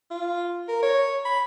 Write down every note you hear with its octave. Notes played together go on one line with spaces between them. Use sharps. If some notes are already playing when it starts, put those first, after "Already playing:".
F4
A#4
C#5
B5